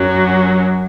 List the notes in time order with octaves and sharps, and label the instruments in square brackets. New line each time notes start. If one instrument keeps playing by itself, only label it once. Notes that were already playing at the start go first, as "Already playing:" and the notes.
Already playing: [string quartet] F#2 F#3